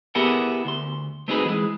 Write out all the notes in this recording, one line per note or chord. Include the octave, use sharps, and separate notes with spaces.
B3 E4 G4 G#4 A#4 F#5
D2 C6
A3 C4 D#4 F#4 G#4 B4
E3 G#3